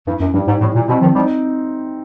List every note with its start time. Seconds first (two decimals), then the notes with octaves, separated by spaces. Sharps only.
0.07 G2 E3
0.20 F#2
0.34 G2 G3
0.48 G#2
0.61 A2 E3
0.75 A#2
0.88 B2 C4
1.01 D#3 F3
1.15 F3 G3 D#4